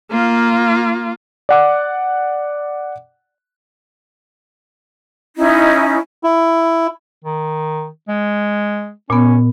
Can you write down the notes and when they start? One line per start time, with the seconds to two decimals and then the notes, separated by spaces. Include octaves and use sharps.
0.11 A#3 F4
1.49 D5 F#5 D6
5.37 C#4 D#4 E4
6.23 E4
7.25 D#3
8.08 G#3
9.10 A#2 B3 C#4